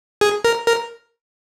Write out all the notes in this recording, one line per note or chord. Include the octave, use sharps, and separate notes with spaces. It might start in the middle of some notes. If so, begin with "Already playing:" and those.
G#4
A#4
A#4